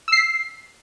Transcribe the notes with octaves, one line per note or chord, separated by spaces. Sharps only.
E6 B6 C7